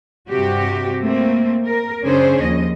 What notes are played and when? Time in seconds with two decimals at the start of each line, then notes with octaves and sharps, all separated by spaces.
0.28 G2 C3 F#4 G4
1.01 A3 A#3 C4
1.66 A#4
2.03 F#2 C#3 C#4 D4 G#4 C5
2.40 D#2 F3 D#5